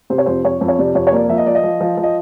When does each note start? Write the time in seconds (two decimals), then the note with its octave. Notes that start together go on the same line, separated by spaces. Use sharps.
0.10 C3 C5
0.18 C#5
0.26 F2 C5
0.44 F2 C#5
0.61 F2
0.68 C#5
0.78 C3 D5
0.95 F2 C#5
1.07 C#5
1.12 A#3 D5
1.29 F3 E5
1.38 D#5
1.46 F3 D5
1.55 D#5
1.63 F3
1.81 F3
1.97 F3
2.03 D#5